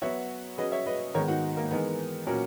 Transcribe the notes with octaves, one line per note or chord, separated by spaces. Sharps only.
F#3 B3 F#4 C#5 E5
F#3 C#4 G#4 B4 D#5
C#5 E5
B4 D#5
G#2 D#3 G#3 B3 A#4 C#5
D#4 F#4
A#3
E3 G#3 B3 D#4 A#4
A#2 F#3 C#4 F#4 A#4